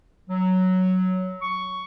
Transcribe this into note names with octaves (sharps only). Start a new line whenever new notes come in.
F#3
C#6